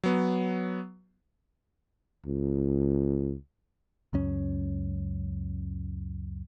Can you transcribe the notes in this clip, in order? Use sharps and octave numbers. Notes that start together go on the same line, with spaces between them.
F#3 B3
C#2
C#2 F#2 C#4